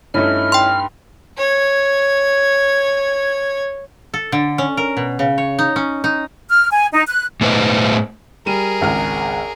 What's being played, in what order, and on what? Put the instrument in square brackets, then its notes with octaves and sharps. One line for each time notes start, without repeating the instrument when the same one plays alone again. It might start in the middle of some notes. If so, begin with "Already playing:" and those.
[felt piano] G2 A3 D#4 [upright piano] C#4 E4 [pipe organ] F6
[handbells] G5 C6
[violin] C#5 G#6
[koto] A4
D3
C#4
A#4
B2
C#3
C#5
D#4
C#4
D#4
[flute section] F6
G#5
D#4
F#6
[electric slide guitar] A2 A3 B4 C5 D#5
[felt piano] G3 D#7 [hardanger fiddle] G#4 A#4
[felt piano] G#1 C#2 F6